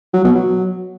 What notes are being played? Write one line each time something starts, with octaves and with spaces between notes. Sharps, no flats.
F#3
B2
F#3